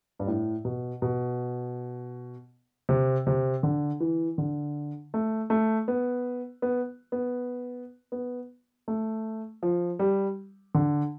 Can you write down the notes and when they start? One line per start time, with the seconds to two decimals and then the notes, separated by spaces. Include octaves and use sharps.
0.19 G2
0.27 A2
0.65 B2
1.02 B2
2.89 C3
3.27 C3
3.63 D3
4.00 E3
4.38 D3
5.14 A3
5.50 A3
5.88 B3
6.62 B3
7.12 B3
8.12 B3
8.88 A3
9.63 F3
9.99 G3
10.75 D3